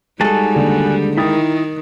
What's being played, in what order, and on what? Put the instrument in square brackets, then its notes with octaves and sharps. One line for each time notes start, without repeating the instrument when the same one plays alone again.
[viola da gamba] G3 D#4 [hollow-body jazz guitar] G#3 A4 [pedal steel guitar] F#4 G#5 A5
[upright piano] D#2 D3 D#3
[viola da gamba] D#3 [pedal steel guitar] E4 A#4 [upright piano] G5 D#6 A6